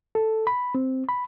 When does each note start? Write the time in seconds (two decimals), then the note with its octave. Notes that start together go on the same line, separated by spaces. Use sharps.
0.15 A4
0.47 B5
0.75 C4
1.09 B5